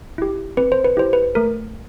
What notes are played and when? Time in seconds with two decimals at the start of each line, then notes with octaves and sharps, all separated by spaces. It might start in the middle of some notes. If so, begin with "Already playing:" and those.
0.18 E4 G4
0.57 C4 B4
0.72 C5
0.85 B4
0.97 E4 G4 C5
1.13 B4
1.35 A3 A#4